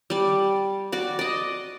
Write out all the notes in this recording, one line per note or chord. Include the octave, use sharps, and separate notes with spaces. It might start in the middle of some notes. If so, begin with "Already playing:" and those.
G3 D5
F#4 D5
D5 D#5